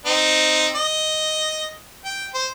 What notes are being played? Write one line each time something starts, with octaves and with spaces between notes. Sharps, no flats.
C4 D#4
D#5
G5
C5